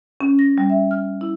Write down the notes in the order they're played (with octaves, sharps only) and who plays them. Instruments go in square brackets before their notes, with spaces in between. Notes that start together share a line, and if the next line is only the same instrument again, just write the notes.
[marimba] C#4
A#6
G3
E5
F6
E4